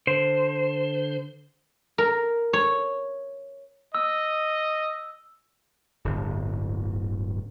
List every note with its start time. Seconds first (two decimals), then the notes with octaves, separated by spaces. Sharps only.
0.07 D3 C5
1.98 A#4
2.53 C#5
3.95 D#5 E6
6.05 D1 G1